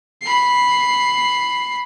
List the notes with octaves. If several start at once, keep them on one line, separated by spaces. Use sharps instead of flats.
B5 C7